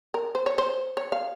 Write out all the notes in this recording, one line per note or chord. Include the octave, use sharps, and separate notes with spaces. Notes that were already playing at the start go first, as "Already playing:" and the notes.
A#4
C5
C#5
C5
C#5
F5